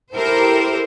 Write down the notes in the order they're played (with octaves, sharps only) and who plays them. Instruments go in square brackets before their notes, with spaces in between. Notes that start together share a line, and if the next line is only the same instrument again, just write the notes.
[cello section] E4 G4 A4 A#4 C5